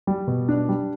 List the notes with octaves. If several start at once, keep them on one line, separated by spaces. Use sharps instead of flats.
G3
B2
D4
G3